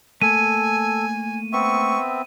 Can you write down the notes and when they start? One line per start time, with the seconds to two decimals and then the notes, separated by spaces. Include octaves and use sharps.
0.22 A3 A#3 A4 G#5 D#7
1.53 B3 C4 E5 C#6